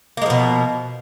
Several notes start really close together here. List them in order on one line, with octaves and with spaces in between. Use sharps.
A#3 G#3 F3 B2